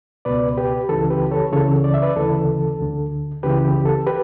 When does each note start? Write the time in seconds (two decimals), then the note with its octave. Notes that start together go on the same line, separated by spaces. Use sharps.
0.25 C#2 B2 B4 D5
0.57 G4 B4
0.89 C#2 C#3 E3 A4
1.10 G4 B4
1.31 A4 C#5
1.52 C#2 C#3 E3 A4 C#5
1.84 D5
1.94 E5
2.02 B4 D5
2.16 D2 C#3 E3 A4
2.80 D2 D3
3.43 C#2 C#3 E3 G4 B4
3.65 G4
3.85 A4
4.07 G4 B4